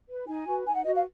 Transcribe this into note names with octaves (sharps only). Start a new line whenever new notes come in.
B4
D#4 G#5
F#4 B4
D#4 G#5
F#5
F#4 B4 D#5
F5